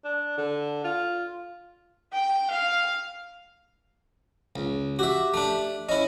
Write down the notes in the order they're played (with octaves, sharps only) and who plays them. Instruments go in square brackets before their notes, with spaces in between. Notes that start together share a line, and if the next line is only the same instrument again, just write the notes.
[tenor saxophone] D4
D3
F4
[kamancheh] G5
F5
[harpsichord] C#2
[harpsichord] F#4 E5 [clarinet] G4
[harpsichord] A3 D4
[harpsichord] C#4 E4 [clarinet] D#5